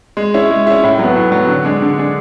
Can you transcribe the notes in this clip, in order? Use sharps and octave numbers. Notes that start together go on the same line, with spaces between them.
G#3
C#4 E4
G#3
C#4 E4
A2
F#3 B3
A2
F#3 B3
D3
G#3 D4 G#4
D3
G#3 D4 G#4